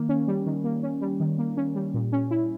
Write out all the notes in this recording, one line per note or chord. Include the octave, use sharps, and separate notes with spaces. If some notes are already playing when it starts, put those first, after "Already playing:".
Already playing: D#3 A#3
C#4
G3
D#3
A#3
C#4
G3
D#3
A#3
C#4
G3
A#2
C#4
E4